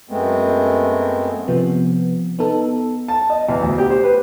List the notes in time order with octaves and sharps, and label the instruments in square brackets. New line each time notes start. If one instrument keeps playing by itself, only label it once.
[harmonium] F#2 G#3 A3 B3 C4
[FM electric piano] C3 F3 B3
B3 D#4 A4
[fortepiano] A5
D#5
E2
D2
G4
C5
B4